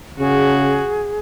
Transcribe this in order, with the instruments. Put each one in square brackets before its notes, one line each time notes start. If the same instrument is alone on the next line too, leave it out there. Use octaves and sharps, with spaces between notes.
[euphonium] C#3 [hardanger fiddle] F#4 [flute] G#4